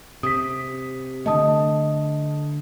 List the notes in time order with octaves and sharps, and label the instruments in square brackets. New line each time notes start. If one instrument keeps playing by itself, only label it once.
[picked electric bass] C3 [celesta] D#6 B6
[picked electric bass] D3 A3 [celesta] D#5 A5 D#6